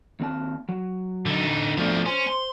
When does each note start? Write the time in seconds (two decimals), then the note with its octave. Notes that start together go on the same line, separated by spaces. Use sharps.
0.20 D#2 C4 A5
0.69 F#3
1.26 D3 D#4
1.78 F2 B2 F3 A3 D4
2.06 C#4 C5
2.27 C6